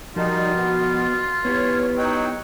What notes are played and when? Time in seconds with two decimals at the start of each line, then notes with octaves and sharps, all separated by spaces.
0.16 F3 G3 D#4 F4 F#4 A#4 A5
0.55 B2 B3
1.45 B3 E4 G4 B4 C#5
1.97 F#3 D#4 G5